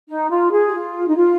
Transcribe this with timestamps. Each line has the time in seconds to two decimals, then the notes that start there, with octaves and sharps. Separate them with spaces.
0.08 D#4
0.30 F4
0.52 G#4
0.68 G4
0.74 F4
1.08 D#4
1.17 F4